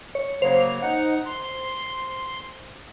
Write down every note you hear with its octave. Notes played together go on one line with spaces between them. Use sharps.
C#5
C#3 F#3 A#3 C5 F7
D#4 F#5
C6